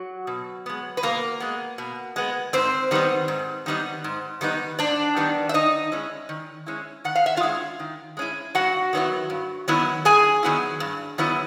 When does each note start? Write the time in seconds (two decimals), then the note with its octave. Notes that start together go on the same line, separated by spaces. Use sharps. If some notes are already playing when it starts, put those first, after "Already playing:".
Already playing: F#3 F#4
0.27 B2
0.66 G#3 B3
0.97 B4
1.03 B2 A#3 A#4
1.40 G#3 B3
1.78 B2
2.16 G#3 B3
2.53 G#2 C4 C5
2.91 D#3 G3 B3 D#4
3.28 G#2
3.66 D#3 G3 B3 D#4
4.04 G#2
4.41 D#3 G3 B3 D#4
4.79 G#2 D4 D5
5.16 D#3 G3 B3 D#4
5.49 E5
5.54 D#3 D#4 D#5
5.92 G#3 C#4 E4
6.29 D#3
6.66 G#3 C#4 E4
7.04 D#3 F#5
7.16 F5
7.26 E5
7.37 F4 F5
7.43 G#3 C#4 E4
7.80 D#3
8.17 G#3 C#4 E4
8.55 G2 F#4 F#5
8.93 D#3 F#3 B3 E4
9.30 G2
9.68 D#3 F#3 B3 E4
10.05 G2 G#4 G#5
10.43 D#3 F#3 B3 E4
10.80 G2
11.18 D#3 F#3 B3 E4